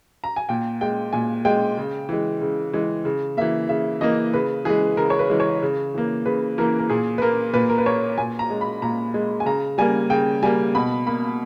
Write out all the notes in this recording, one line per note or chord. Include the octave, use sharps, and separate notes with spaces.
A#5
G#5
A#2 G5
G#3 G5
A#2 G#5
G#3 G5
C#3
E3 G#3
C#3
E3 G#3
C#3
E3 A#3 E5
C#3 E5
E3 A#3 D#5
C#3 B4
E3 G#3 G#4
C#3 A#4
C#5
B4
E3 G#3
C#5
C#3
E3 A#3
C#3 B4
E3 A#3 A#4
A#4
A#2 G#4
B4
A#3 A#4
A#2 B4
A#4
B4
A#3 C#5
A#2 G#5
A#5
G#3
B5
A#2 A#5
G#3
G#5
C#3 A#5
G3 A#3 G#5
C#3 G5
G3 A#3 G#5
B2 B5
A#3 B5